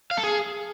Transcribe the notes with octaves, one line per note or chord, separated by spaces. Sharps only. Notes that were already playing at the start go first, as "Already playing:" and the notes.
F5
A4
G#4